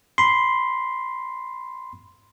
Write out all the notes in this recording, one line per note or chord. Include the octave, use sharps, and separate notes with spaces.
B5 C6